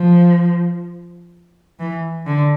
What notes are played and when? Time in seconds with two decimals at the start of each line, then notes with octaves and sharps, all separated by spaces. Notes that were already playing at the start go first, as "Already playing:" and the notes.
Already playing: F3
1.80 E3
2.26 D3